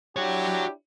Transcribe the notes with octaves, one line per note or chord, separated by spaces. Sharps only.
D4 E4 F#4 G4 C#5